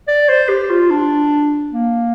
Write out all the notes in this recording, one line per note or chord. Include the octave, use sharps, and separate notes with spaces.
D5
C5
G4
F4
D4
A#3